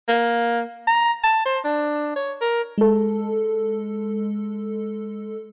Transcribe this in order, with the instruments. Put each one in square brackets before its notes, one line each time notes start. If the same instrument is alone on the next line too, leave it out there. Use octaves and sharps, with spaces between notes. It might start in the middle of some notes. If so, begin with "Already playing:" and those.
[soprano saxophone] A#3
A#5
A5
C5
D4
C#5
A#4
[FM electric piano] G#3 A4